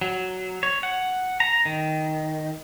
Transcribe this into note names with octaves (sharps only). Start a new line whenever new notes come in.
F#3
C#5
F#5
A#5
D#3